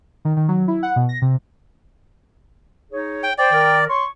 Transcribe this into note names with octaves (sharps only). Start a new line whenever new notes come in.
D#3
D#3
F#3
E4
F#5
B2
A#6
C3
D#4 G#4 C#5
G5
C5 D5 G5
D#3 A#4
C#5 C6 C#6